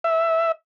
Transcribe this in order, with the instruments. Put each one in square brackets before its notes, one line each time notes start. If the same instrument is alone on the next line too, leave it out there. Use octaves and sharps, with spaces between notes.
[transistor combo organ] E5